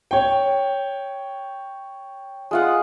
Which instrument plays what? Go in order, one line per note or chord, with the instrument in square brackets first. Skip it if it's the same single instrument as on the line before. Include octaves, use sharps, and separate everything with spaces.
[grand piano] C#5 G5
[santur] G#3 F4 F#5